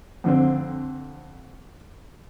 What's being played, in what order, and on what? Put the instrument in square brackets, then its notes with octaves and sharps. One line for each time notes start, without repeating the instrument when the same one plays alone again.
[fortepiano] F2 D3 C4